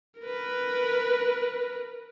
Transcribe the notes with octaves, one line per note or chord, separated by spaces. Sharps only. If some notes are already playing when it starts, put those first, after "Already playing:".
A#4 B4